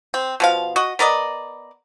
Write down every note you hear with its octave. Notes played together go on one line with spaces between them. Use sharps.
C4
B2 F3 F5
F#4 D#5
B3 A#4 D5 D#5